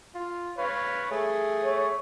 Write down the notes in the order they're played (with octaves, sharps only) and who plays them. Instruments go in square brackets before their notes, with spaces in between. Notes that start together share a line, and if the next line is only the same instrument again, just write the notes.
[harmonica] F4
B4 C#5 F5
A3 G#4
[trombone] C#5